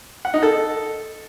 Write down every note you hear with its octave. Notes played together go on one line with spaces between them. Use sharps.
F#5
D#4
A4